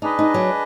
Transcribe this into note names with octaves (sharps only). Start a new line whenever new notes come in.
D4 D#4 G#4 B4 D#5
D#4
F#3